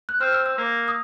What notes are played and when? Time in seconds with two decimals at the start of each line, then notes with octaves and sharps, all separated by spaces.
0.09 F#6
0.21 C4 F6
0.33 E6
0.46 E6
0.58 A#3
0.88 D#6